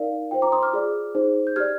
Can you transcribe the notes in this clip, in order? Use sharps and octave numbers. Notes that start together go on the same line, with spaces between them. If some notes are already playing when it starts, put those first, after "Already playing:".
Already playing: D#4 A#4 D5 F5
F4 C5 G5
A#5 D6
C6 D#6
D6 F6
F4 G#4 D5
D#4 G#4 C5
G6
G4 D5 F6 G#6